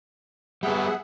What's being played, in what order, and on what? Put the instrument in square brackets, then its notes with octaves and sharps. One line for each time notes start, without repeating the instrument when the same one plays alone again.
[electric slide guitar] G3 B3 [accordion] G#4 E5 F#5